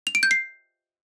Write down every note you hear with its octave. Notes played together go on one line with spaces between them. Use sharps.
F7
D7
G6
C7